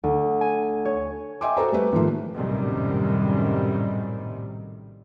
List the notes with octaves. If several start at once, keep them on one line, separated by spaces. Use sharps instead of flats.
D2
G#5
C#5
D#5 E5 G5 G#5 C6 D6
F#4 A4 C5 A#5
G3 A3 B4
G#2 D#3 F3 A3 A#3
A#1 F#2 A2 C3 D#3 G3